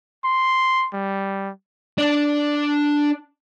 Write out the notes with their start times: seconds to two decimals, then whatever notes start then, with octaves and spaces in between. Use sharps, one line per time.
0.24 C6
0.93 G3
1.98 D4 D5